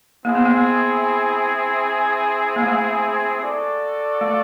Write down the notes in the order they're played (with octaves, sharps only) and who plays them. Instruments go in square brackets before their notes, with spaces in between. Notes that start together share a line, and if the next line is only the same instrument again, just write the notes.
[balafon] A#3 [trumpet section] C4 E4 G#4
[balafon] B3
A#3
A#3
A3
[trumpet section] F#4 A4 D5
[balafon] A3